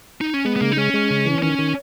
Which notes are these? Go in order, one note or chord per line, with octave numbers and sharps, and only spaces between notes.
D#4
C#4
G#3 B3
B3
C#3 A#3
D#4
G#3 C#4
G#3
C#3
E3
D#3 C#4
D#3